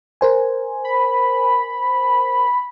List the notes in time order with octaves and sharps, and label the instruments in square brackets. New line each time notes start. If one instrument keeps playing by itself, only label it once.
[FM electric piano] A#4 C5 G#5
[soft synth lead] B5